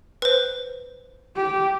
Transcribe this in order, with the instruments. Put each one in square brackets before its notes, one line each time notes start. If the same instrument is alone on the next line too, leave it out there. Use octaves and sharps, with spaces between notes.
[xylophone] B4 C5
[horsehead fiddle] G4